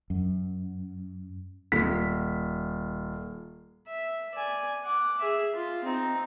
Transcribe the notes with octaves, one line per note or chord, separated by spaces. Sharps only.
F#2
D#1 B6
E5
D5 G#5
F#5 D6
G#4 E5
F4
C4 D#4